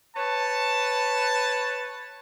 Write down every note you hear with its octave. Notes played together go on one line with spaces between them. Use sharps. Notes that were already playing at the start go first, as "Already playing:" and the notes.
B4 C#5 A5